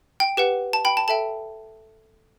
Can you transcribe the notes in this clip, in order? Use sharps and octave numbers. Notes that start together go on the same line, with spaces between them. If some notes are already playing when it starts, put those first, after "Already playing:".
G5
G4 B4 F#5
A5
G5 B5
A5
A4 E5 G5 A5